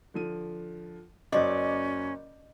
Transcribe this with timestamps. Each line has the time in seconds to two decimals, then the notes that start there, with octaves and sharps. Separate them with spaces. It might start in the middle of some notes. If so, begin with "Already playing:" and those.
0.14 D3 F3 D#7
1.32 F#1 F#3 C#4 C5 D5 D#5